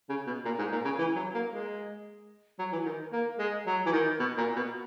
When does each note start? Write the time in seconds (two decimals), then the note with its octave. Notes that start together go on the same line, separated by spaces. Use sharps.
0.09 C#3
0.27 B2
0.45 A#2
0.58 G#2
0.72 A#2
0.85 C#3
0.99 E3
1.16 F#3
1.34 A#3
1.52 G#3
2.59 F#3
2.72 E3
2.86 D#3
3.12 A#3
3.39 G#3
3.67 F#3
3.86 E3
3.93 D#3
4.20 B2
4.38 A#2
4.56 B2